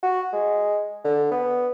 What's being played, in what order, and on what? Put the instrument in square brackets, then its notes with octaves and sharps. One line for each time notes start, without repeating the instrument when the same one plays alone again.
[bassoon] F#4
G#3
D3
B3